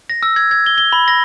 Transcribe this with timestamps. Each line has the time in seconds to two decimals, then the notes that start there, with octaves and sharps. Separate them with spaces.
0.10 A#6
0.23 E6
0.36 G#6
0.51 G#6
0.66 G7
0.78 G7
0.93 B5
1.08 A#6